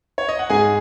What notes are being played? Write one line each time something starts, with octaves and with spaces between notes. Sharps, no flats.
C#5
D#5
F#5
G#2 G#4 G#5